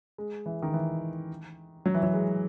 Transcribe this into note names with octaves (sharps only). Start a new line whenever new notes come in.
G#3
E3
D#3
E3
F#3
E3
F#3
G#3